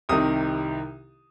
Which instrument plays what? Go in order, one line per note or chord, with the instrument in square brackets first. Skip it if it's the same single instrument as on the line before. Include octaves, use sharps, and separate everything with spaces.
[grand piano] C2 C3 D#3 D#6